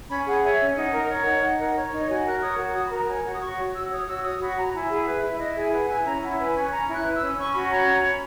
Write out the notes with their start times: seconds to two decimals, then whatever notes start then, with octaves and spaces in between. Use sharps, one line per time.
0.09 C#4 B5
0.26 G#4 F#5
0.43 C#5 E5
0.60 C#4
0.76 D#4 F#5
0.92 A#4
1.09 C#5
1.25 D#4
1.42 D#4
1.58 A#4
1.75 C#5
1.91 D#4
2.08 F#4 G#5
2.24 A#4 F#6
2.41 C#5 D#6
2.57 F#4
2.74 F#4 D#6
2.84 B5
2.90 A#4 A#5
3.07 C#5 G#5
3.23 F#4 F#5
3.34 D#6
3.41 F#4 C#6
3.57 C#5
3.73 F#4 E6
3.90 C#5 D#6
4.06 F#4 E6
4.23 C#5 D#6
4.39 F#4 B5
4.56 C#5 A#5
4.73 E4 G#5
4.89 G#4 F#5
5.05 B4 E5
5.22 E4 E5
5.38 E4 D#5
5.55 G#4 E5
5.71 B4 F#5
5.88 E4 G#5
6.05 C#4 A#5
6.21 E4 F#5
6.38 B4 G#5
6.54 C#4 G#5
6.70 C#4 A#5
6.87 E4
6.93 F#6
7.04 B4
7.15 E6
7.20 C#4
7.37 C#4 C#6
7.53 F#4 B5
7.70 C#5 A#5
7.86 C#4 A#5
8.03 C#4 B5